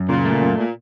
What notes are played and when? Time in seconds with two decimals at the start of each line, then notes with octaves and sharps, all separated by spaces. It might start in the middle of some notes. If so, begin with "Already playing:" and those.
Already playing: F#2
0.09 A#2 C#3
0.25 A3
0.41 F#2
0.57 A#2